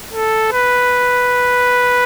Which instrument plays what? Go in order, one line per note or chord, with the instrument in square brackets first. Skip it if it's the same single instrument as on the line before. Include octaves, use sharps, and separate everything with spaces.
[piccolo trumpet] A4
B4